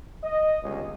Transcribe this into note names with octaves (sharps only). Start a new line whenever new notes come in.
D#5
G1 C#2 G2 C#3